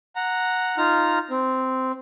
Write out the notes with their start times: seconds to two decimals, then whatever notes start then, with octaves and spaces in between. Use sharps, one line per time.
0.16 F#5 A#5
0.77 D#4 F4 A#5 F6
1.30 C4